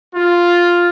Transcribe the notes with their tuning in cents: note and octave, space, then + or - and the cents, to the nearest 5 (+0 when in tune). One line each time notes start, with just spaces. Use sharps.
F4 +0